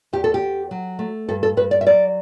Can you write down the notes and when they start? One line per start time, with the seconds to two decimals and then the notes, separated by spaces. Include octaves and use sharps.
0.13 E2 G4
0.24 A4
0.34 G4
0.42 E2
0.71 F#3
0.99 A3
1.29 G2 A4
1.43 A4
1.57 G2 B4
1.71 D5
1.81 E5
1.86 F#3 D5